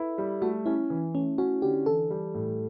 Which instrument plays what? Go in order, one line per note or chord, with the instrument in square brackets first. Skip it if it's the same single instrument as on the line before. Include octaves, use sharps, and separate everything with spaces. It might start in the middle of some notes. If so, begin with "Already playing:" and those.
Already playing: [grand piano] E4 [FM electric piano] A4 B4
[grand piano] G3
[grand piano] A3 [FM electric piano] F#4
[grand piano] C#4 [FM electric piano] E4
[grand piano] E3
[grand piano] A3 [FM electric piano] C#4
[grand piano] C#4 [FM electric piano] F#4
[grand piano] D3 [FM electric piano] G4
[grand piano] E3 [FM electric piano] A4
[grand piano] G3
A2